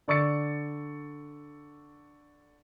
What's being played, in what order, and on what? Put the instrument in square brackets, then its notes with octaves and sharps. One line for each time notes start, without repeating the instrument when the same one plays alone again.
[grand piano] D3 D5 C#6 E6 A6 C#7